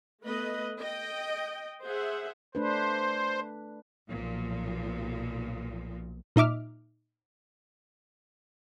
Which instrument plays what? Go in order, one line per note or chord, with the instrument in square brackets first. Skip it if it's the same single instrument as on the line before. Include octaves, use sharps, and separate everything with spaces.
[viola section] A3 B3 B4 D#5
D#5 G5
G#4 C5 E5 F#5
[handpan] A3 D4 B4 [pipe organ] C5
[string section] B1 A#2 F3
[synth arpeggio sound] A#2 D#4 E5 D6 F6